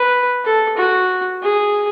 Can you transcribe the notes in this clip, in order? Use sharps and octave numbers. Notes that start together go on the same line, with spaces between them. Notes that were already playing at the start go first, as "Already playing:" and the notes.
Already playing: B4
A4
F#4
G#4